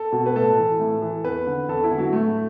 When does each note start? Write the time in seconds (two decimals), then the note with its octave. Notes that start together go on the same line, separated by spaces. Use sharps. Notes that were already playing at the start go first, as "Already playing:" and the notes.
Already playing: A4
0.12 B2
0.26 B4
0.35 A2 A4
0.58 E3
0.79 A2
1.02 E3
1.24 E2 B4
1.47 D3
1.68 E2 A4
1.84 E4
1.91 D3
1.98 F#3
2.13 A2 A3